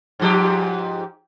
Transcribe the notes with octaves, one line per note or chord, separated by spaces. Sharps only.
G#2 F3 G4